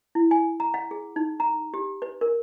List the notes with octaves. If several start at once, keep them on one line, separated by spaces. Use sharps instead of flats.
E4
G#5
A#5
F#5
G#4
D#4
A#5
G4
B4
A#4